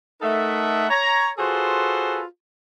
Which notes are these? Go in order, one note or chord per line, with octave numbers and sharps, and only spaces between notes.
A3 D#4 A4 A#4 E5 F#5
C#5 A#5
F4 F#4 G#4 A4 B4 C5